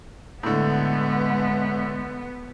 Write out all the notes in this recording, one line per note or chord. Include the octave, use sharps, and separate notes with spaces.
A2 D3 G#3 B3